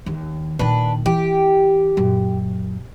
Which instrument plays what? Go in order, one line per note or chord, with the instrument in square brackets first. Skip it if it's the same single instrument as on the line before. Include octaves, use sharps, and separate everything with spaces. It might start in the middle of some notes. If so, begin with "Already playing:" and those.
[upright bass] D#2 D#3
[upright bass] A#2 D#3 [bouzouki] D4 B4
[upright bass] E3 [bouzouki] G4
[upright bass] F#2 A#2